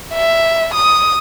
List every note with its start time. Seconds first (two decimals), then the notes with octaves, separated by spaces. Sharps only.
0.14 E5
0.74 D#6